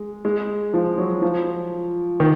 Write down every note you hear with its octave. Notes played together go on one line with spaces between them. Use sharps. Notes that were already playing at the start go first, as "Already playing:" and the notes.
Already playing: G#3
G#3
F3
F#3
F3
D#3